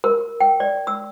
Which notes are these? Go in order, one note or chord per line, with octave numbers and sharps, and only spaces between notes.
A#4
G5
D5
E6